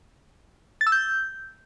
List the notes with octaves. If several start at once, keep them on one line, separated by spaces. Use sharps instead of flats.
A6
E6
G6